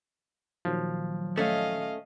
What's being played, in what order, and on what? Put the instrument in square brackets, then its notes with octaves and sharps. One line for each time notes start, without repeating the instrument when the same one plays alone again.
[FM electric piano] A#2 D#3 F#3 [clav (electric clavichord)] F3
[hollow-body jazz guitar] A3 C#4 [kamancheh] D#5 F5